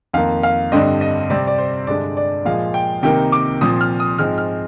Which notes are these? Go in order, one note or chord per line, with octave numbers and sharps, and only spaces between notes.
F2 D#3 A#3 F5
F5
G2 D3 G3 C4 D#5
D#5
C3 G3 C4 D5
D5
C5
G2 D3 G#3 D4 D5
D5
A#2 F3 G#3 F5
G5
C3 D#3 A#3 G5
D6
A#2 F3 C4 D#6
F6
D#6
G#2 F3 G#3 C4 F6
F6